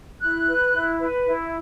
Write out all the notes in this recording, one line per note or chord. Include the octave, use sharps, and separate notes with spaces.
E4 F#6
B4
E4
B4
E4